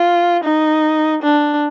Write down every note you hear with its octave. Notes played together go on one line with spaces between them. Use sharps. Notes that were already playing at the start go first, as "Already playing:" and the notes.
Already playing: F4
D#4
D4